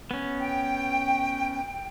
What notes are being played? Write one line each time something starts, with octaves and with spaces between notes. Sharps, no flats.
B3 C#4
G5